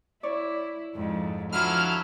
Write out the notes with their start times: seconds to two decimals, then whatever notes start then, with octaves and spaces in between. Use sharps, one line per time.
0.23 E4 C#5 D5
0.94 F2 G#2
1.52 D3 F3 F#3 E4 F6